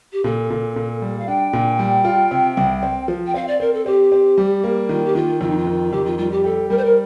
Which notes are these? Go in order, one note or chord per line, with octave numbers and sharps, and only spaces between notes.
G4
A#2 A4
A#2
A#2
G3
F5
D4 G5
A#2
G3
F4
C3
C2
C4
F3
G5
C4 F5
D5
C4 A#4
A4
C4 G4
C4
G3
A#3
D#3 F4
G4
D#3 F4
F2 F4
D#4
F4
D#3
F2 G4
F4
G3 F4
G4
G4 A4
G3 A#4
C5
A#4